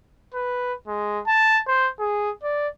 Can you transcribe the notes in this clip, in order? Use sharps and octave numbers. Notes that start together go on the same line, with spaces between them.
B4
G#3
A5
C5
G#4
D5